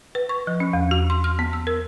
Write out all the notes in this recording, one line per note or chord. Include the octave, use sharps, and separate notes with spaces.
B4
C#6
F3
C#4
E2
F#4
C6
F6
B3
E6
A#4